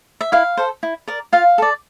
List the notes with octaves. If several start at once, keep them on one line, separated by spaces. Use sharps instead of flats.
E5
E4 F5
A4 C5
E4
A#4 D5
F4 F5
A4 D5